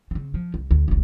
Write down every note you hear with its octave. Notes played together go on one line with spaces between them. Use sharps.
C#3 C4
F3
C2
D2
E1 C2